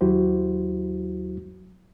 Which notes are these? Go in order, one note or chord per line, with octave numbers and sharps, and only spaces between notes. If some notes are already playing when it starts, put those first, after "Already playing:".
D#2 F#3 E4 F#4 G4 C5